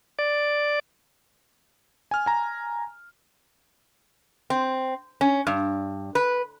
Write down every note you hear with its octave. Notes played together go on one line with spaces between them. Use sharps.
D5
G#5 F6
G#5 A#5
C4
C#4
G2
B4